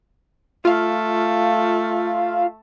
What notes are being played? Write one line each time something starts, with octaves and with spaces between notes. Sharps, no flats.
A3 F4 F5